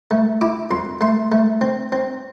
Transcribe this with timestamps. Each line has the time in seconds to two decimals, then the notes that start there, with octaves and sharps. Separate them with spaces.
0.11 A3
0.41 E4 D6
0.71 F2 C6
1.01 A3 C6
1.32 A3
1.61 C4
1.92 C4